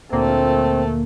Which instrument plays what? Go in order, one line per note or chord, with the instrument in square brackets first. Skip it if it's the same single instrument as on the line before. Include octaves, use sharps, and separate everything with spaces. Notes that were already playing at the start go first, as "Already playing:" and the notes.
[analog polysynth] D2 A#2 A#3 [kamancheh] A3 [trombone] C4